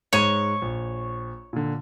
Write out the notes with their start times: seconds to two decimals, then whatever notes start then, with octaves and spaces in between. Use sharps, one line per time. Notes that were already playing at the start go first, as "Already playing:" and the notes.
0.13 G#2 G#3 C#5 D#7
0.62 A#1
1.53 A#2 D3